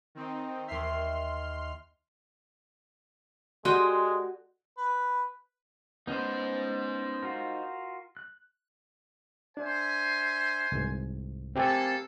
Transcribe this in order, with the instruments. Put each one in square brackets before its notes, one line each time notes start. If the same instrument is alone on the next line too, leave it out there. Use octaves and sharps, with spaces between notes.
[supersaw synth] D#3 C4 D#4
[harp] D#2 E5 [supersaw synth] C6 F6 C7
[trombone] G#3 [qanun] F#4 D#5 G5 [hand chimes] G4 A4 D5 [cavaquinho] C6
[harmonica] B4
[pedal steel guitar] B3 C#4 [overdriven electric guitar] D#4 C5
[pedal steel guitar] F4 F#4 A#4
F#6
[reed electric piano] D4 [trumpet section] C5 E5 G#5
[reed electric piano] C2 G#2
[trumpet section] A#3 A4 [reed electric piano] C4 G4 G#5